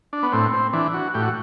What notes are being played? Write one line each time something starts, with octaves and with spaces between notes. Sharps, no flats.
D4
B3
A2 C4
C4
E3 D4
F#4
A2 G4
F#4